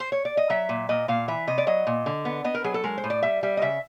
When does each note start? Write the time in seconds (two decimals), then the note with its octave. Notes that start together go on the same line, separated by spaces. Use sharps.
0.00 C5
0.12 C#5
0.25 D5
0.37 D#5
0.50 F#3 E5
0.69 A#2
0.89 A#2 D#5
1.08 A#2 F5
1.28 E3 E5
1.47 C3 D#5
1.58 D5
1.67 F#3 D#5
1.87 A#2
2.06 D3
2.25 B3
2.44 B3 D#5
2.54 A#4
2.64 F#3 G#4
2.74 A4
2.84 G#3 A#4
2.98 C5
3.04 A2
3.10 D5
3.23 G3 E5
3.43 G3 E5
3.57 D#5
3.62 C#3 E5